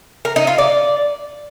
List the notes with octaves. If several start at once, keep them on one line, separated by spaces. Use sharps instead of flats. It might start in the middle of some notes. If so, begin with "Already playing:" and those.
A#4
D#4
F4
D5